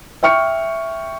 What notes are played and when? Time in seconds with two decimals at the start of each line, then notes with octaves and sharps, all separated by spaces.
0.23 E5 G5 C#6 F6 C#7